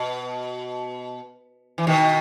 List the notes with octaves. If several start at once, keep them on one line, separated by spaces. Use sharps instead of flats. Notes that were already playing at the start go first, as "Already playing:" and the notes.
Already playing: B2
E3
B2 D#3